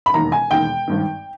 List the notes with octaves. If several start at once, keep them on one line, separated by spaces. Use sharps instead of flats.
B5
E1 D#2 D#3 A#5
G#5
E1 D#2 D#3 G5
G#1 G2 D#3